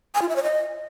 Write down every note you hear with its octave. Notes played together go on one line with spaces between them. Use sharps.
G#5
F4
E5
C#5
D#5